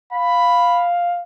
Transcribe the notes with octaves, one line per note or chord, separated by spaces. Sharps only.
F5 B5